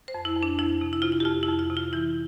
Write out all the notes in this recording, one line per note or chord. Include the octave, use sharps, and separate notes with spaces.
C5
F2
E4
F2
D4
F2 E4
C3
E4
C3 F4
E4
G4
F2 F4
E4
F2
F4
C3
F4
E3 E4